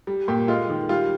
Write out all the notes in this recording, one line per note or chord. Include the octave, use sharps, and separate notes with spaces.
G3
A#2 G4
G#3 F4
D#3
G3 F4